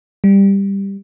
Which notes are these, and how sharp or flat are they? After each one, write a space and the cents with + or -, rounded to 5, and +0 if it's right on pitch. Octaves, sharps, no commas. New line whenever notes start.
G3 +10